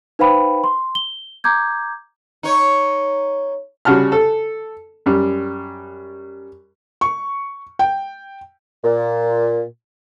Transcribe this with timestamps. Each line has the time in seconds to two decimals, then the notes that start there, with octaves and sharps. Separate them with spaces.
0.19 D#4 B4 C5 F5 G5 B5
0.64 C6
0.95 G7
1.44 A#5 D6 G6 G#6
2.43 D#4 C#5
3.85 C#3 G3 F#4 A5 F6
4.12 A4
5.06 F#2 G3
7.01 C#6
7.79 G5
8.84 A#2